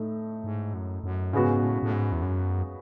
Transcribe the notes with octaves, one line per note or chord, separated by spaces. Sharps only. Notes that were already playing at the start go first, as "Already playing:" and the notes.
Already playing: A2 A3 D#4
G#2
F#2
F#2
G#2 C#3 G#3 B3 F#4
A2
A2
G#2
E2
F#2